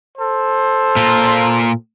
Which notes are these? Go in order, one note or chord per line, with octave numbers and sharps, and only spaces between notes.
A4 C5
A#2 F4